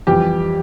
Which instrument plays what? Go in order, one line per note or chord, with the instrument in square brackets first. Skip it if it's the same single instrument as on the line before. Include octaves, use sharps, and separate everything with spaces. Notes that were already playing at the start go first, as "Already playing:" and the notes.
[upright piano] F2 E3 G3 G4